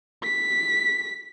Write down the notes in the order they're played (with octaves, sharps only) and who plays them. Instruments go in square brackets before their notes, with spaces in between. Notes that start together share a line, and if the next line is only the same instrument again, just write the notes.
[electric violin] B6